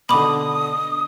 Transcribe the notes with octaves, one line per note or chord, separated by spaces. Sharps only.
B2 D3 B5 D6 D#6